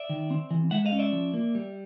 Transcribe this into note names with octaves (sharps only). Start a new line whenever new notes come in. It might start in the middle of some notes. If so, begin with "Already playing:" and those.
Already playing: D5 E5
D#3
C4
E3
G#3 E5 F#5
D#5 F5
C#4
D5 E5
F3
A#3
G3